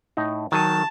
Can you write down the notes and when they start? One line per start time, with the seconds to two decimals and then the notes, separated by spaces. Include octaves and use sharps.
0.17 A2 D#4
0.52 D#3 F#3 G#5 A5